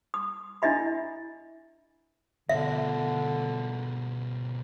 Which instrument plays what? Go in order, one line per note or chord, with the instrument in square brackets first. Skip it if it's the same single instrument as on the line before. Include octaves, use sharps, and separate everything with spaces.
[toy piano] D#6
D4 E4 D#5 E5 B5
[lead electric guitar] B2 F3 [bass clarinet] D3 [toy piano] E5